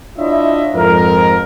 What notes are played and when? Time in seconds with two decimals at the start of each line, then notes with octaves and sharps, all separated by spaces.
0.18 D4 E4 F4 C#5 D#5 E5
0.74 F2 G#2 A#4